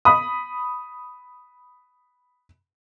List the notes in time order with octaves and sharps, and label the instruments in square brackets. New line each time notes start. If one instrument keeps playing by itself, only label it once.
[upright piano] B5 D#6